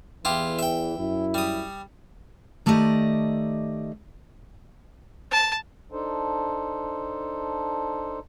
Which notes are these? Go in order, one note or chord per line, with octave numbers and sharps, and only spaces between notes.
E2 E3 E4 F4 G4
E5 G5
F#2 E4
G3 D#6
D#3 A3 G4 D5 D#5
A5
D4 D#4 A4 C5